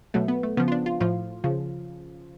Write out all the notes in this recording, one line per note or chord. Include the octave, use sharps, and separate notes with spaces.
B2 F#3 A3
B3
A3
C#3 F3 B3
F4
D4
F4
A2 F3 F4
C#3 F3